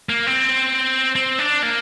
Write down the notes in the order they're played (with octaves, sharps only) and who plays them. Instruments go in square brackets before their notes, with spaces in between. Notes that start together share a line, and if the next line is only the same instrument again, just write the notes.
[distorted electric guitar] A#3
C4
C4
D4
A#3